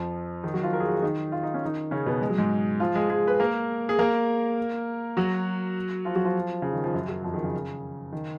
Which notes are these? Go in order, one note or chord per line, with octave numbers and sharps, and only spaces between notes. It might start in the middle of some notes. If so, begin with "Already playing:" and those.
Already playing: F2 F3
D#3 D#4
F#3 F#4
F3 F4
A#4
G#4
F#4
F4
D#3 D#4
F4
D#4
C#4
D#3 D#4
C#3 C#4
B2 B3
G#3
F#3
G#2 G#3
F3 F4
G#3 G#4
G#3 G#4
B4
A#3 A#4
G#4
A#3 A#4
F#3 F#4
F3 F4
F#3 F#4
F3 F4
C#3
D#3
F3
F#2 F#3
F#2 F#3
F2 F3
D#3
C#3
D#3